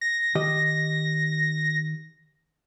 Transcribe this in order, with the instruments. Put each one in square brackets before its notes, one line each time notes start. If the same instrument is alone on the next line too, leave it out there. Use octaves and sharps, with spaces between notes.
[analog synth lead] A#6
[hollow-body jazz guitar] D#3 G4 D#5